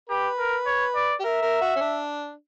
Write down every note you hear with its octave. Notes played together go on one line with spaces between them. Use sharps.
G4 B4
A#4
C#5
D5
G4
A#4 E5
A#4
F#4
C#4
D4